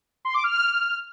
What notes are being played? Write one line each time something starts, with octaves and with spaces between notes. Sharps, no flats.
C6
D6
F6